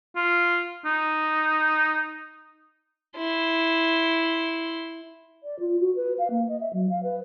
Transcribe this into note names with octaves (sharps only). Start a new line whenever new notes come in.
F4
D#4
E4 C6
D5
F4
F#4
B4
F5
A#3
D#5
E5
F#3
F5
B4